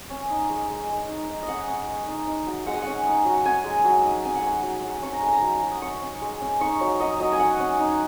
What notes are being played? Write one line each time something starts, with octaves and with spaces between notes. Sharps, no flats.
C#4
D#4
G#3
G#3
G#3
D#4
D#4
D#5
C#4 F#5
C#4
G#3
D#4
D#4
F#3
G#3 F#5
G#5
C#4 F#5
D#4
F#3
C#4 G#5
G#3
F#3
D#4
C#4 G#5
F#5
G#3 G#5
F#3
F#3
C#4 C#6
A#5
G#3 G#5
A#5
F#3
F#3
D#6
C#4 C#6
C#4
G#3
C#4
D#4 C#6
F#3 C#5
F#3 D#5
F#3 D#5
G#5
C#4 F#5
C#4
D#4